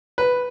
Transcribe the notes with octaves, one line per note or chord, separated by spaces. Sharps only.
B4